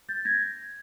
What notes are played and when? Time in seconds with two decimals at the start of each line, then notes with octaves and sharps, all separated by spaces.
0.09 G6 A6
0.25 G#6 A#6